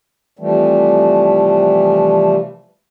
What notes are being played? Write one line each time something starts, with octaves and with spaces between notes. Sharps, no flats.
C3 E3 F3 G3 A3